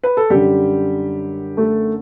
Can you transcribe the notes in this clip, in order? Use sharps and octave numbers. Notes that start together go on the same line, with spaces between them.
B4
A4
F#2 D3 G3 G4
A3 A4